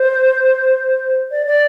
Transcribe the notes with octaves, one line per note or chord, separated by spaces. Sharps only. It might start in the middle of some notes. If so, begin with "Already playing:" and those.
Already playing: C5
D5
D5